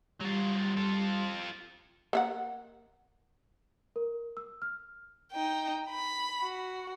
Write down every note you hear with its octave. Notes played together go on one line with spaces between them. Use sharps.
F#3 G3 F4
F4 A4
A#3 E5 F#5
A#4
E6
F6
D#4 G5
B5
F#4